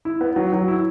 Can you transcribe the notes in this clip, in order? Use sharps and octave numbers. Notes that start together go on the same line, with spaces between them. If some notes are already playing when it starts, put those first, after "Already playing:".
E4
B3
F#3
F#3
E4